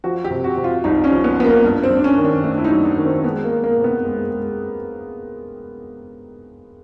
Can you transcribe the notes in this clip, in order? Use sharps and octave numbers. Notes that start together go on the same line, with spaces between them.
F3 F#4
G4
C3
F#4
C3
F4
C2 D#4
C#4
F3
B3
F3 B3
A#3
G2
C4
G2
D4
C#4
D#3
D4
A3 D4
E4
D#4
F#3
D4
D#3
C4
G#3 B3
A#3
G#3
A#3
C3
B3
G#3
G#3